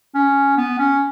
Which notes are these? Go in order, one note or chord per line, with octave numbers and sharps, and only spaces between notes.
C#4
B3
C#4